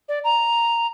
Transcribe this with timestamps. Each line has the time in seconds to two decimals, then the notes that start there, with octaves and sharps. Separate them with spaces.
0.09 D5
0.24 A#5